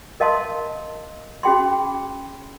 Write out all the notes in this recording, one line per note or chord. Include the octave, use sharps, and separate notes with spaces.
A#4 D#5 F5 A5 C6 D#6
C#4 F#4 G#4 G5 B5 C6